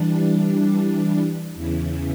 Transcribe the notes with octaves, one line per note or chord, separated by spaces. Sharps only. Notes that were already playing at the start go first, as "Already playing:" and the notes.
Already playing: E3 G3 D4
E2 C#3 E3